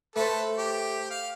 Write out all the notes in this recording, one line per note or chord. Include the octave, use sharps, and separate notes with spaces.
A3 A4 B4 C5
G4
F5